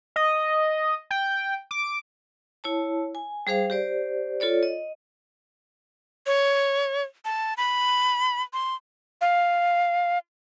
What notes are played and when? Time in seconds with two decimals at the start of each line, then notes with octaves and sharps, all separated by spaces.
0.16 D#5
1.11 G5
1.71 D6
2.64 E4 C#5 A5
3.15 G#5
3.47 G3 G#4 C5 F5
3.70 G4 C5 D5
4.40 F4 A4 C#5 D5
4.63 D#5
6.26 C#5
7.25 A5
7.57 B5
8.53 C6
9.21 F5